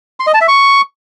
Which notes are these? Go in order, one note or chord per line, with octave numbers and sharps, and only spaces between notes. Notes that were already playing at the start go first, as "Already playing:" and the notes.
C6
D#5
A5
E5
C#6